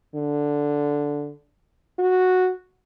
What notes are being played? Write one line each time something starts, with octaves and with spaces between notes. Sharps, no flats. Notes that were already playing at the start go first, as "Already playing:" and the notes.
D3
F#4